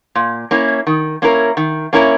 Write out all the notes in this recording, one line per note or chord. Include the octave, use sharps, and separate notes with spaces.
A#2
A#3 C#4 E4
D#3
A#3 C#4 E4 A#4
D#3
A#3 C#4 E4 A#4